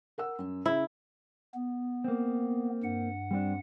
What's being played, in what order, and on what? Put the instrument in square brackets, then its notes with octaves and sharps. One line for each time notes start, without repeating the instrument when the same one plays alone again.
[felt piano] A#4 F#5 E6
F#2
[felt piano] C#3 [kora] E4
[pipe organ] B3
[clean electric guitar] A#3 C4
[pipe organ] G2 F#5
[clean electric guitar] G3 C4 D4